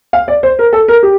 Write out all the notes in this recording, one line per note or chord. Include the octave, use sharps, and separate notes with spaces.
F5
D5
C5
A#4
A4
A#4
G4